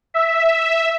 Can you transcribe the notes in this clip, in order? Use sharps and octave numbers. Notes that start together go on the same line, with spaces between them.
E5